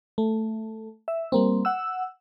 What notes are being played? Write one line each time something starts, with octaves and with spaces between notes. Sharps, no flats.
A3
E5
G3 A#3 C4
F#5 E6